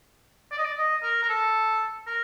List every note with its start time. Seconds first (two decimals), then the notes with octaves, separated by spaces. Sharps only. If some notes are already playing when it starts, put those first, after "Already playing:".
0.52 D5
0.58 D#5
0.65 D5
0.78 D#5
1.03 A#4
1.23 A#4
1.29 A4
2.07 A#4